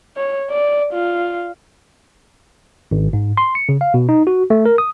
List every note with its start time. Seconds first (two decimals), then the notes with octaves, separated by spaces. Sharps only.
0.17 C#5
0.51 D5
0.94 F4
2.91 G#1
3.13 G#2
3.37 C6
3.55 C#7
3.69 C#3
3.81 F5
3.94 B2
4.09 D#4
4.27 F#4
4.50 A3
4.65 A#4
4.78 D#6